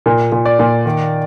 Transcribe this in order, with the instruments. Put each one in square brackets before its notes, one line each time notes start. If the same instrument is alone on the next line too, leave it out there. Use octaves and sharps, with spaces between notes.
[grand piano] A#2
A#2
D5
A#2
D#3